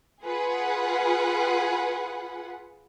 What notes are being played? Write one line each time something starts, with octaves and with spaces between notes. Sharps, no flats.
F4 G#4 B4 F#5